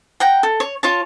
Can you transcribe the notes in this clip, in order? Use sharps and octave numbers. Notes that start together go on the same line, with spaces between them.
F#5 G5 A#5
A4
C#5
F4 C#5 A5